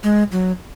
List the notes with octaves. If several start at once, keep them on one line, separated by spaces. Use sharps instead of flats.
G#3
F#3